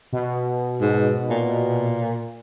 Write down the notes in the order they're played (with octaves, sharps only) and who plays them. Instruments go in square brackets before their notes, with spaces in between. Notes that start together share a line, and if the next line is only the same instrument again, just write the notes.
[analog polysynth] B2
[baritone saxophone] G#2
A#2